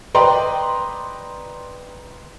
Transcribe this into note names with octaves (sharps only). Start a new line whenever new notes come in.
B4 D5 D#5 G5 A#5 C6